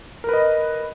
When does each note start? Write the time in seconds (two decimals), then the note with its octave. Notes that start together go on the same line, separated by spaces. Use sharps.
0.24 A#4
0.29 B4
0.33 D#5